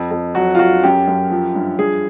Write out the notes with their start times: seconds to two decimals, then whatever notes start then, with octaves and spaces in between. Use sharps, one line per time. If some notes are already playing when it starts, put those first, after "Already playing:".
Already playing: F2
0.11 F2
0.35 F#3 F#4
0.55 F4
0.59 F#3 F#4
0.83 F#2 G4
1.07 F#2
1.30 F3
1.55 G2
1.78 G2 G#4